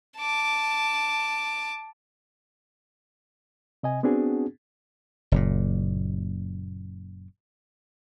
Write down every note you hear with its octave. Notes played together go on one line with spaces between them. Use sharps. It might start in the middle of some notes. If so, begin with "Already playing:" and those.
A5 D6
C3 D#5 G#5
B3 C4 D4 F#4 G#4
F#1 A#2